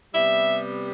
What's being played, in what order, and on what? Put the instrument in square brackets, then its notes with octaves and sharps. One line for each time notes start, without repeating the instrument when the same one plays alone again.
[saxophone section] C3 G3 B3 E5